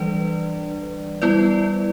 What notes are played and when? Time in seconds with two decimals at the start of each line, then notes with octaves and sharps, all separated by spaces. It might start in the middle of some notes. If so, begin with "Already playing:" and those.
Already playing: E3 G3 D4 B4 D5
1.22 G3 B3 E4 B4 D5